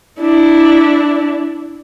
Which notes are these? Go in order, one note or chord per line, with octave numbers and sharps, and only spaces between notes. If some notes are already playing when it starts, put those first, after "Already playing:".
D4 E4